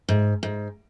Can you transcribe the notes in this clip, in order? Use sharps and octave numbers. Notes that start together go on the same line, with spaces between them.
G#2
G#2